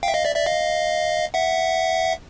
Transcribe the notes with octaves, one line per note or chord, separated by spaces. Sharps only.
F5 G5
E5
D#5 F5
D5 E5
D5 E5
D#5 F5
E5 F#5